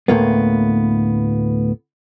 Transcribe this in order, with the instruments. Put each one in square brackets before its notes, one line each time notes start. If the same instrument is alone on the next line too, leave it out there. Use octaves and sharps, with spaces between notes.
[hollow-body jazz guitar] D2 A2 A#3 B3